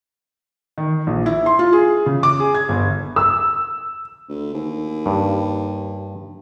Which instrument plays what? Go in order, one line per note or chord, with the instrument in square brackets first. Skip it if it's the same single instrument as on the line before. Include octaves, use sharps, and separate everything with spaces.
[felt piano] D#3
A#1
E4
C6
F4
G#4
C#3
D6
G#4
G#6
G1
[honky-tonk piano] E6
[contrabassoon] D2
D#2
[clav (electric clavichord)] G2